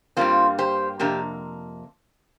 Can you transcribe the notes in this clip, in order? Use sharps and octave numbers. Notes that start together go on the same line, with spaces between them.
G2 G3 A#3 C4 F4
G4 C5
F2 C3 A#3 D4 G4